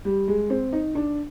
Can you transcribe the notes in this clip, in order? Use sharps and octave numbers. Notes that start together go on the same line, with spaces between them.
G3
G#3
C4
D#4
D4